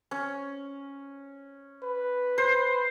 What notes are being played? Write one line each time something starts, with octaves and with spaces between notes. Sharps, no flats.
C#4
B4
C5